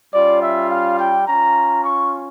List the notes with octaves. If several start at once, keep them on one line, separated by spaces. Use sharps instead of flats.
G3 C#4 F4 D5
E5
F5
G5
C#4 F4 A#5
C#6